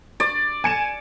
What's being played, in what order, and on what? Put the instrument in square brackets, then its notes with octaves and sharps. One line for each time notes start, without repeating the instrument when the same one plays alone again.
[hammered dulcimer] D5
[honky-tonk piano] G#5 C#7 E7